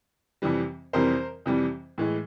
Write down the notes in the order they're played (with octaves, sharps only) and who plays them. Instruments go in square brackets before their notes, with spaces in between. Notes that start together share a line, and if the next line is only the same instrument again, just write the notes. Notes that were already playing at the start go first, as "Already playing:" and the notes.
[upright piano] F2 C3 E3 G3
F2 C3 E3 G3 A#4 C5
F2 C3 E3 G3
A2 E3 G#3